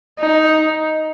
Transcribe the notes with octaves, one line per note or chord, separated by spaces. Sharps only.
D#4